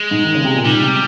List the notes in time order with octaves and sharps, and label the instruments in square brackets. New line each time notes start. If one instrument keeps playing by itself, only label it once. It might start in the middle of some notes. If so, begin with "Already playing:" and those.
Already playing: [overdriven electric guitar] G#3
[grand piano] G#2
D#3
C#3
C3
A#2
[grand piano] G#2 [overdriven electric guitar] G3
[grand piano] C3